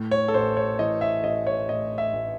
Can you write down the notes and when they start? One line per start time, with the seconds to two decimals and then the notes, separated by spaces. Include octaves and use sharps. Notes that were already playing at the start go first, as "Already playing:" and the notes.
Already playing: A2
0.11 C#5
0.28 A4
0.34 A1 C5
0.57 C#5
0.79 E3 D#5
1.01 E5
1.24 A1 D#5
1.47 C#5
1.69 A2 D#5
1.98 E5
2.13 A1